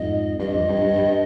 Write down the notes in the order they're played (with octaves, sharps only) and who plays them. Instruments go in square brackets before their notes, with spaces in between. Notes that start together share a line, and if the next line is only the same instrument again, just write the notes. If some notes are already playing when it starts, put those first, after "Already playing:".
Already playing: [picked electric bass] F2 G#2 [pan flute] D#5
[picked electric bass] G2 [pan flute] D#5
[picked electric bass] F2
G2
G2
G2